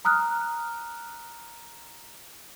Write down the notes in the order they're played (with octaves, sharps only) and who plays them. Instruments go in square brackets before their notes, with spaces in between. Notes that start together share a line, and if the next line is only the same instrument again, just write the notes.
[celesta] A#5 D#6 F6 F#6